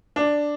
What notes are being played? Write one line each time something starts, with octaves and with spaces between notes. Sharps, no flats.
D4